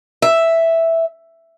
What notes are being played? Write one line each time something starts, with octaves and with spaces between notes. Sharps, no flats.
E5